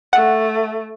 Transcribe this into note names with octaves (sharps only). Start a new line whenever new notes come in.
A3 F#5